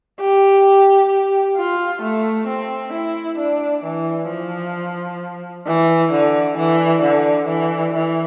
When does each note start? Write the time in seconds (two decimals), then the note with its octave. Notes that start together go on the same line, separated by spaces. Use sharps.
0.20 G4
1.57 F4
2.02 A3
2.48 C4
2.93 E4
3.38 D4
3.85 E3
4.29 F3
5.67 E3
6.11 D3
6.58 E3
7.02 D3
7.48 E3
7.94 E3